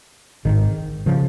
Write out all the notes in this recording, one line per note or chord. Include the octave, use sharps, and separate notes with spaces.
G#1 G#2 D#3
C#3 F3